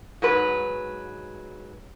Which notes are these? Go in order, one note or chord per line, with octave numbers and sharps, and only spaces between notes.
G#2 F#3 B4